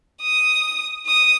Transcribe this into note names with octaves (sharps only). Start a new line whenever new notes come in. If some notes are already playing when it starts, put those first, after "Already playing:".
D#6
D#6